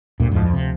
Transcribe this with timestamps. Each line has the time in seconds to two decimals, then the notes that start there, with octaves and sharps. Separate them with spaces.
0.20 D2 G2 A#2
0.31 F2 G#2 F3
0.42 F2
0.53 C3